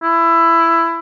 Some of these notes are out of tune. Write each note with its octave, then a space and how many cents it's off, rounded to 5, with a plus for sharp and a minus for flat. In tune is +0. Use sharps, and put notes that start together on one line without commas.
E4 +15